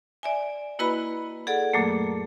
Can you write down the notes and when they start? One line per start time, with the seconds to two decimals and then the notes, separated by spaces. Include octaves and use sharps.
0.23 D5 E5 G#5
0.79 A#3 E4 F#4 B4 D#5 B5
1.47 G#4 A4 D5 F#5
1.74 F#2 A#2 F#3 A3 A#3